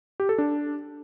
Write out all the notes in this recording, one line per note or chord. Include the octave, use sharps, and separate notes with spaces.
G4
A4
D4